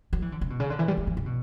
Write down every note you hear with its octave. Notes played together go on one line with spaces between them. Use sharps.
F#3
E3
D3
C#3
B2
C#3
D3
E3
G3
F#3
E3
C#3
B2